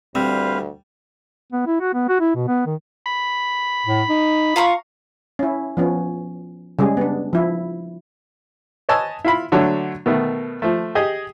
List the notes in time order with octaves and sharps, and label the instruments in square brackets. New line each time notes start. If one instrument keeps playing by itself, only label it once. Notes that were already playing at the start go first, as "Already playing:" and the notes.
[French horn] D2 [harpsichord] G3 [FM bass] C4 [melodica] B4 C5 F5
[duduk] B3
E4
F#4
B3
F#4
E4
B2
B3
D#3
[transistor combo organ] B5
[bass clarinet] A2
D#4
[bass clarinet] F4 [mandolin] F5 A#5 C#6
[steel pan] C#4 E4
F3 B3 C#4
C#3 G3 G#3 G#4
B3 D4
F3 E4
[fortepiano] B4 C#5 D#5 G#5 A5 E6
E4 F4 B5
D3 F#3 A3 D4
B2 D#3 A3
F3 A3
G4 G#4 D#5